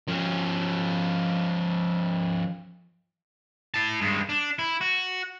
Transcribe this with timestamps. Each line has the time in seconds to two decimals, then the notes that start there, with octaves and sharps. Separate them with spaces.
0.08 F3 C#4
3.74 E4 A5
4.01 G2 G#3
4.29 D4
4.59 E4
4.81 F#4